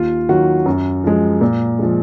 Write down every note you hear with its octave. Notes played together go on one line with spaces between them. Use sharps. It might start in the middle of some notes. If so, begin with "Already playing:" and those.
Already playing: D#2 F4
D#3 F#3 F#4
F#2
F3 G#3
A#2
F3 G#3